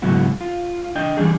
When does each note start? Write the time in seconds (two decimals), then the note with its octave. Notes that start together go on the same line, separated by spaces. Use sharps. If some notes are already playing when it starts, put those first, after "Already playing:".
0.02 G#2 C#3 F#3 B3 E4 F#4
0.41 F4
0.95 D4 D#5 G5
1.17 E3 G3 C#4 D4 G#4